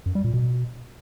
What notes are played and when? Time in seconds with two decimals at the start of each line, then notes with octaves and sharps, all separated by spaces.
0.06 F#2
0.15 G3
0.24 A#2
0.34 B2